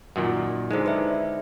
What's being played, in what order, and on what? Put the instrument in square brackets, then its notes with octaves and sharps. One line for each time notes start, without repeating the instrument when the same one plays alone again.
[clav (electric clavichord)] F#2 A#2 D#3
[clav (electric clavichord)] D3 G#3 [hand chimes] D#4 E4 C5
[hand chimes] B4 D5 E5